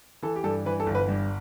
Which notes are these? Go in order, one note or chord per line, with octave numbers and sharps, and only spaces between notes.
E3 A4
G4
G2 A4
E3 B4
A4
G1
B4
G2